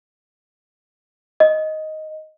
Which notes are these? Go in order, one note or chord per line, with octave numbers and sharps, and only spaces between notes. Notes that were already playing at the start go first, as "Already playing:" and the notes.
D#5